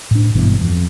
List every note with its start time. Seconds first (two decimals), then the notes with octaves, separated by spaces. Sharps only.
0.11 A2 D4
0.35 G#1 G2 B2 E3
0.61 F2